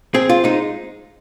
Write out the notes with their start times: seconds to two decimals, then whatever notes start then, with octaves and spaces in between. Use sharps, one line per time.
0.14 C4 G#4
0.29 F4
0.44 G#3 D#4